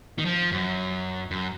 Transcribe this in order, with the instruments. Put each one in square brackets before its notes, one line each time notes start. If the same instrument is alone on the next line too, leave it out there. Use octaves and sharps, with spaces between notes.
[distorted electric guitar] D#3
F3
F#2
F#2